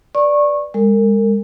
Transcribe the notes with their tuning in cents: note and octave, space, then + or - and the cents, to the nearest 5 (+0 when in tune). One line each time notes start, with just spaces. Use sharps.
B4 +0 D5 +0 C#6 -20
G#3 -30 A#4 -35